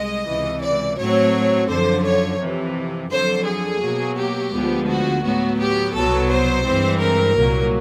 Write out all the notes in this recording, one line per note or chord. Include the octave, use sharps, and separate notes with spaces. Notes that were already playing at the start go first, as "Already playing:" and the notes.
Already playing: C2 G#3 D#5
C#2 C3 E3
D5
A2 F#3 A3 C4 C#5
F#2 D3 F3 C5
C#5
F2 C3 E3
F2 D3 F#3 C5
G#4
B2 F#3 A#3
G4
D2 D3 F3 G#3 B3
F#4
A2 F#3 B3 F#4
G4
C2 B2 F#3 B3 A4
C5
G2 E3 G#3 C4
A#4
C2 A#2 F#3 A#3